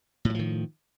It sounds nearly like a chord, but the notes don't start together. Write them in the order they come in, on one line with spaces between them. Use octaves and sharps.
A2 F#3 F3 D#3